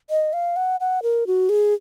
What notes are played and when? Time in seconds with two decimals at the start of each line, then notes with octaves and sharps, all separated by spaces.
0.10 D#5
0.33 F5
0.56 F#5
0.80 F#5
1.03 A#4
1.27 F#4
1.49 G#4